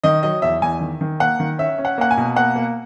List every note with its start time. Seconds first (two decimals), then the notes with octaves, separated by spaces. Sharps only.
0.04 D#3 D#5
0.23 F#3 D#5
0.42 E2 E5
0.62 E2 G#5
0.81 D#3
1.01 D#3
1.20 A#3 F#5
1.40 D#3
1.58 C#4 E5
1.78 C#4
1.85 F#5
1.98 A#3 F#5
2.11 G#5
2.17 B2
2.36 A#3 F#5
2.55 A#3